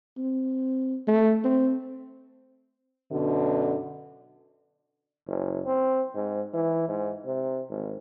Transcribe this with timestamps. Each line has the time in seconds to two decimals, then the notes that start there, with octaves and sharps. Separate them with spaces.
0.18 C4
1.08 A3
1.44 C4
3.10 F#2 B2 D3
5.27 F#1
5.66 C4
6.15 G#2
6.54 E3
6.88 G#2
7.26 C3
7.70 G#1